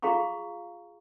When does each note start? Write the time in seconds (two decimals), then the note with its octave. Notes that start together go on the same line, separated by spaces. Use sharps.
0.02 F4 G#4 F5 A#5 C6 C#6